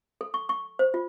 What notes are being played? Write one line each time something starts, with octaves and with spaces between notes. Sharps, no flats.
A4
C#6
C#6
C5
F4